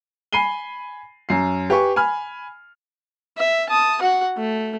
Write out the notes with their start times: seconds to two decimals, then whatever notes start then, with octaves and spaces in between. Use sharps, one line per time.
0.33 G#5 B5 C7 D#7 G7
1.29 F#2 C7
1.70 G4 B4 G#5 C#6
1.96 G#5 B5 F6
3.37 E5
3.69 A5 D#6
4.01 F#4 F#5
4.37 A3